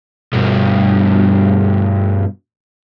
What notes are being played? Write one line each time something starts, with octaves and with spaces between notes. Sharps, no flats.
G2 B2